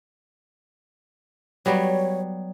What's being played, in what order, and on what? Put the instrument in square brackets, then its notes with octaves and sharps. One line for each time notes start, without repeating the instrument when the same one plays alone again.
[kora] F#3 G3 B3 [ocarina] C#5